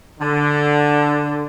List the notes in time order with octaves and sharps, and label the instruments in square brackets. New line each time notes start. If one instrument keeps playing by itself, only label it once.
[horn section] D3